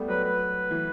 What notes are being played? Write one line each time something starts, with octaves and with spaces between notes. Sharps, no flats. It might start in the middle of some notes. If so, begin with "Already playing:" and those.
Already playing: G3 A3 B3
F#3 B4
B4
E3